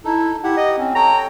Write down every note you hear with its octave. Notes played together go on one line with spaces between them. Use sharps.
D#4 E4 A4
E4 G4 F#5
D#5
C4 C#4
A4 C#5 G5 A#5